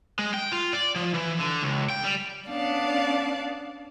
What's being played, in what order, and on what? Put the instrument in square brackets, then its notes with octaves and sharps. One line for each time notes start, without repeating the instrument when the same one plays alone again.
[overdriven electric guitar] G#3
G5
F4
D5
F3
E3
D3
C#2
G5
G3
[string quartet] B3 C#4 D4 D5 F5 A5